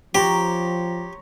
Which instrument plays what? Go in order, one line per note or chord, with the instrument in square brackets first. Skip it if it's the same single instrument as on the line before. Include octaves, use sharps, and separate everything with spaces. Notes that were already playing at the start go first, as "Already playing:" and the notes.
[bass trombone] F3 [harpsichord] G4 [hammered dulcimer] C#5 A#5 C6